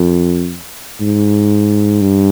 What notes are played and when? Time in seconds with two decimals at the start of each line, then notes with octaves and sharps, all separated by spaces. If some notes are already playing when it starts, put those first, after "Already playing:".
Already playing: F2
1.01 G#2
2.01 G2